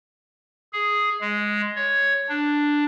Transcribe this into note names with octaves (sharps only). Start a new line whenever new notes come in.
G#4
G#3
C#5
D4